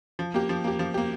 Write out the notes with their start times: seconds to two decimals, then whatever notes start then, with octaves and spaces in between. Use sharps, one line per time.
0.19 F3
0.34 A#3 G4
0.49 F3
0.64 A#3 G4
0.79 F3
0.94 A#3 G4